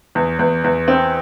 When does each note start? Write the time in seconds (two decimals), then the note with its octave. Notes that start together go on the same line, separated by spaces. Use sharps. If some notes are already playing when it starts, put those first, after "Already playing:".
0.15 E2
0.39 E2
0.64 E2
0.88 C4